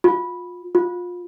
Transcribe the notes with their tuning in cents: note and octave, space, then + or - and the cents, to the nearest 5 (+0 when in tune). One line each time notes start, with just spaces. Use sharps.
F4 +30
F4 +25